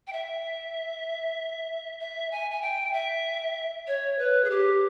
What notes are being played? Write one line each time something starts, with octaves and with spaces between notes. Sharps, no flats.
G5
E5
E5
G#5
G#5
G5
E5
C#5
B4
G#4
G4